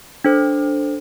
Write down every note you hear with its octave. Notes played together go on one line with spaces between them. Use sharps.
D4 A4 C5